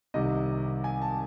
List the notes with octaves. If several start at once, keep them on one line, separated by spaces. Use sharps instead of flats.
C2 C3 D#3 D#5
G#5
A5